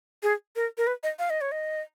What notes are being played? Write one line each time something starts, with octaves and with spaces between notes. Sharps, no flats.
G#4
A#4
A#4
B4
D#5
F5
D#5
C#5
D#5